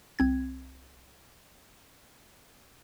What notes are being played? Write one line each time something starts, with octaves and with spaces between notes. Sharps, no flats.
C2 C4 G#6